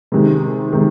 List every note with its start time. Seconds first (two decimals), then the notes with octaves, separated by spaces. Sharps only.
0.12 C3 D#3 G#3
0.72 C3 D#3 G#3